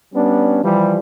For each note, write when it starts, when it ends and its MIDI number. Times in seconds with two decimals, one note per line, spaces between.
0.14 0.60 55
0.14 0.60 59
0.14 0.60 61
0.14 0.60 62
0.64 0.98 52
0.64 0.98 53
0.64 0.98 55